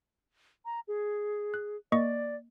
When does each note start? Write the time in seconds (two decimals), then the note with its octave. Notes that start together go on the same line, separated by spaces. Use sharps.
0.65 A#5
0.88 G#4
1.54 F#6
1.92 A#3 D5 D#5 C#6